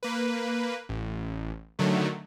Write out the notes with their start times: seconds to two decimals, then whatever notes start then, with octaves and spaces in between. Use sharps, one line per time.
0.03 A#3 B4
0.89 A1
1.79 D3 D#3 F#3 A3